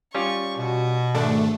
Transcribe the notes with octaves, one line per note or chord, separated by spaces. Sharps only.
G3 C#4 F4 C#6
B2 F#4
G#1 A3 D4